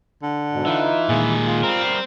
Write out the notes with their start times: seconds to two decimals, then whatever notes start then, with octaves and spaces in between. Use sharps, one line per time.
0.23 D3
0.52 G#2 B2
0.66 E3 D#4 F4 E5
1.09 A#2 D#3 G#3
1.47 F4
1.64 G3 C4 A#4